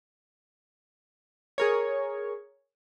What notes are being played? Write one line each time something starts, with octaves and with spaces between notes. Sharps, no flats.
G#4 A#4 C#5